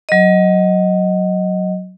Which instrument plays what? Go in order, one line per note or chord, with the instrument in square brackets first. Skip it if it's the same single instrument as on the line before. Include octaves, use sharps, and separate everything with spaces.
[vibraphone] F#3 D#5